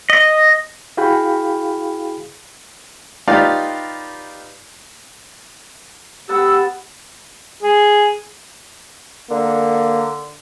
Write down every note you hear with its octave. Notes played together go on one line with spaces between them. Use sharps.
D#5
E4 F#4 G#4 F5 G5 B5
D#4 F4 G4 B4 D5 F5
B3 G4 F#5 A5 E6
G#4
D3 A#3